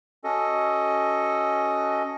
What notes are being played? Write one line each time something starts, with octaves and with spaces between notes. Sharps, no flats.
C#4 F#4 A4 D#5